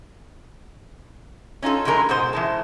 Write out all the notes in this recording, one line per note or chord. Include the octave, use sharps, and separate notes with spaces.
C#4 D#4 F4 A4
A2 D3 F3 G#3 A#4
G#2 B2 G#4 C5
E3 G#3 A5